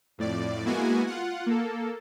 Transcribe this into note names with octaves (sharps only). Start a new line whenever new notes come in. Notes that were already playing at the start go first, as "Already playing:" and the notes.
F2 A2 D5
G#3 A#3 B3 E4 F#4 G#5
F4 F#5
A#3 A4